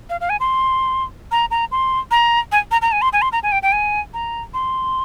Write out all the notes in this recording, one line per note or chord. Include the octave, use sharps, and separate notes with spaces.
F5
F5
G#5
C6
A#5
A#5
C6
A#5
G#5
A#5
A#5
G#5
C6
G#5
C6
A#5
G#5
G5
G5
G#5
A#5
C6